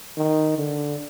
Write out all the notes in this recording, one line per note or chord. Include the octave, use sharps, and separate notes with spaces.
D#3
D3